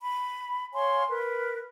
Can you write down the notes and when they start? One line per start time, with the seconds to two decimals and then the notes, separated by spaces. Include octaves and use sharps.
0.01 B5
0.74 C#5 F5 G#5 C6
1.07 A#4 B4